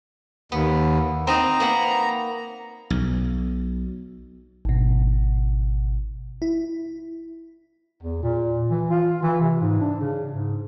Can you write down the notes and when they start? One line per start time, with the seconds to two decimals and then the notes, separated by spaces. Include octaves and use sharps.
0.52 D#2 B3
1.27 C4 D#4 D#5 A#5
1.60 A#3 B3 F#5
2.90 B1
4.65 G#1 B2
6.42 E4
8.03 E2
8.23 A#2
8.71 E3
8.90 F4
9.23 E3
9.41 C3
9.61 G#2
9.81 D4
10.01 C#3
10.31 G#2